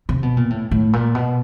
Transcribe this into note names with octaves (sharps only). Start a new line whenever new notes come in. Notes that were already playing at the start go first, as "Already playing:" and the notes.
C3
B2
A#2
A2
A2
A#2
B2